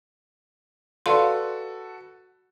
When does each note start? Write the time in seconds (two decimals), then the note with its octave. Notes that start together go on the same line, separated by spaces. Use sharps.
1.06 F#4 A4 B4 D5 F5 C6